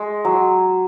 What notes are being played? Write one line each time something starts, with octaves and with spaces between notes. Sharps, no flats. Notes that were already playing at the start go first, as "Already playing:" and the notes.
Already playing: G#3
F#3